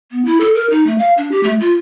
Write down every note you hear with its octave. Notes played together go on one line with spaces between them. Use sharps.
B3
E4
A4
A#4
D#4
A3
F5
D4
G4
A3
F4